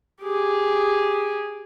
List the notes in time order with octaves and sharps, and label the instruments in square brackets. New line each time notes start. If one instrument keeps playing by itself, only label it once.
[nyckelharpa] G4 G#4